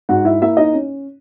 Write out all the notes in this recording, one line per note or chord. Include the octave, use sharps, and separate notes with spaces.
G#2 F#4 F#5
E4 E5
A#3 E4 E5
D#4 D#5
C#4